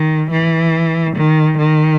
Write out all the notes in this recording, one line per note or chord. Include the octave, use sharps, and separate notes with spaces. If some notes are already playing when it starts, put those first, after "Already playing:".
Already playing: D#3
E3
D#3
D#3